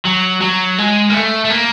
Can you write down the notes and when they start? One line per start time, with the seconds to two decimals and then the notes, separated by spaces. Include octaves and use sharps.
0.05 F#3
0.41 F#3
0.78 G#3
1.09 A#3
1.14 A3
1.45 A3
1.50 A#3